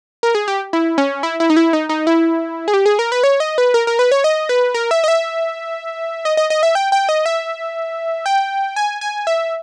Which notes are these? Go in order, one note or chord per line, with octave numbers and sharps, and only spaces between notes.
A#4
G#4
G4
E4
C#4
E4
E4
D#4
E4
D#4
D#4
E4
G#4
G4
G#4
A#4
B4
C#5
D#5
B4
A#4
A#4
B4
C#5
D#5
B4
A#4
E5
D#5
E5
D#5
D#5
D#5
E5
G5
G5
D#5
E5
G5
G#5
G#5
E5